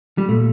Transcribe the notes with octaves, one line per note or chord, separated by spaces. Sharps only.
G3
A#2 A3